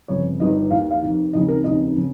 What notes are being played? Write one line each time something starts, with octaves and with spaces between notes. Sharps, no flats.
G1 F2 C#3 C#5
G1 G2 D#3 D#5
D#2 D#3 F5
F5
F1 F2 D#3
F1 D#2 C#3 D#5
A#4
F1 D#2 C#3 D#5
C#3